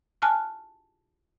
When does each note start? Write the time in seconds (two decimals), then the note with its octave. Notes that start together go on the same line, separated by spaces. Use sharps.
0.22 G#5 A5 F6 F#6